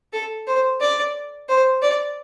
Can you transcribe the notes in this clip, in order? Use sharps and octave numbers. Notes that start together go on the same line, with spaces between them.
A4
C5
D5
C5
D5